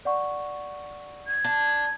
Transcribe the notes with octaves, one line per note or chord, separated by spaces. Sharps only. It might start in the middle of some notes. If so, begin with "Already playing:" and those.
D5 F#5 C#6
G#6
D4